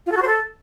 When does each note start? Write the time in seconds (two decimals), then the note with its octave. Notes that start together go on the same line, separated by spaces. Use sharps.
0.06 F4
0.11 A4
0.17 F#4
0.22 C5
0.27 A4